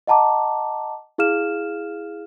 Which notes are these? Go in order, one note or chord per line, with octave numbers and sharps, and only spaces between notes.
D#5 F#5 A5 A#5 D6
E4 G#4 F5 F6 E7